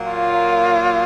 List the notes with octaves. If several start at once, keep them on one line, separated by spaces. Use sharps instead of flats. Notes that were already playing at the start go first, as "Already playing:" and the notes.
Already playing: A#2 F#3 A#3
F4